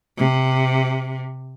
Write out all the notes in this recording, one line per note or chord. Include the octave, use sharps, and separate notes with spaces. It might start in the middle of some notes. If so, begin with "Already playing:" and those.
C3